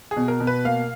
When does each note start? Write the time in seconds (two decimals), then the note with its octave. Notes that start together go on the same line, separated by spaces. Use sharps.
0.11 G#4
0.17 B2
0.28 A#4
0.40 B2
0.47 B4
0.64 A#3 F5